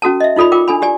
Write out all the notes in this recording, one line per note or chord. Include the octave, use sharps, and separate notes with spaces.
C#4 F#4 A4 A5
D#5 E5
D#4 F4 A4 D5 B5
F4 A#4 G5 D6
D4 A4 G#5 B5
G4 D5 G#5